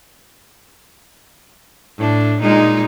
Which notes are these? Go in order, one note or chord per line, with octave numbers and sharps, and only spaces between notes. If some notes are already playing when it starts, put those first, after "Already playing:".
A2 D4
A#2 G#3 D#4